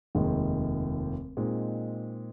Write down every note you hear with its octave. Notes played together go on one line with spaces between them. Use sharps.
F1 D#2 D#3 G#3
A#2 G#3 C4 D#4